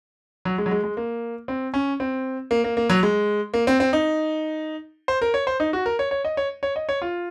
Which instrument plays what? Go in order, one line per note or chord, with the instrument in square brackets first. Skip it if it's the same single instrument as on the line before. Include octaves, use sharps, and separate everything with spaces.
[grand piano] F#3
G#3
F#3
G#3
G#3
A#3
C4
C#4
C4
A#3
A#3
A#3
F#3
G#3
A#3
C4
C4
D#4
C5
A#4
C#5
C5
D#4
F#4
A#4
C#5
C#5
D#5
C#5
C#5
D#5
C#5
F4